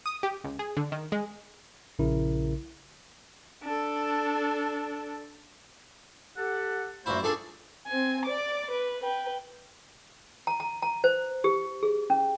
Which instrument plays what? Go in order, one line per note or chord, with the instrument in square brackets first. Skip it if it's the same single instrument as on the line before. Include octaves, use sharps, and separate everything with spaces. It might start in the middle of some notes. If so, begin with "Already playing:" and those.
[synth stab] D#6
G4
C#2
G#4
D3
D#3
G#3
[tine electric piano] A#1 C#3 E4 A#4
[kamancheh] D4 A4
[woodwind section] G4 A4 F#5
[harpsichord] F#2 A#2 E4 [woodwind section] A3 F#4 C5
[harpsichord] A#2 D4 G#4 [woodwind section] A4
[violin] C4 G#5
D5 D6
B4
B4 G5
[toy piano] A#5
A#5
A#5
C5
G4
G#4
C#4